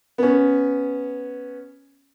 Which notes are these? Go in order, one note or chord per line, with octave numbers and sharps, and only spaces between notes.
B3 C#4